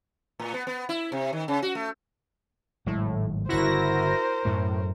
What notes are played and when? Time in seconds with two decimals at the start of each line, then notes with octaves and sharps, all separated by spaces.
0.39 A2
0.54 B3
0.67 B3
0.89 E4
1.12 C3
1.33 D#3
1.48 C#3
1.63 F#4
1.75 A3
2.86 G#1 A2 F#3 G#3
3.49 G1 C#3 E4 F#4 A#4 C5 A#6
4.45 F#2 A2 A3